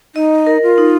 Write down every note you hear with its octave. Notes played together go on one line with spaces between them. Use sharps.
D#4 D#5
A#4
F4
D#4